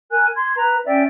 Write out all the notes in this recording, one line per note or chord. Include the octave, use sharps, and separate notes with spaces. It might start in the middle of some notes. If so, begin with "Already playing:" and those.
A#4 G#5 F#6
C6 G#6
B4 A#5
C#4 D5 E5 G5